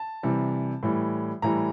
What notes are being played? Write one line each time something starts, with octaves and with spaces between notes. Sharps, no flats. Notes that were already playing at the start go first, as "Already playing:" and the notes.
Already playing: A5
C3 E3 G3
A2 E3 G3
A2 E3 G3 A#5